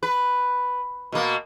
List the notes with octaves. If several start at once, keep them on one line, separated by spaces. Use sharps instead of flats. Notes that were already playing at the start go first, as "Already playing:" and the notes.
B4
B2 A#3